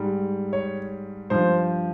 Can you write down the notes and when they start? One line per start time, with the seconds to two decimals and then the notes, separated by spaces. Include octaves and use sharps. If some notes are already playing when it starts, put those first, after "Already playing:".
Already playing: G#2 G3
0.53 C#5
1.30 G2 F3 C5